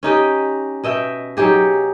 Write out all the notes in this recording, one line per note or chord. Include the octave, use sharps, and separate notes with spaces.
C#4 D#4 G4 D#5
B2 D#5 E5 G5
F#3 D#4 G4 G#4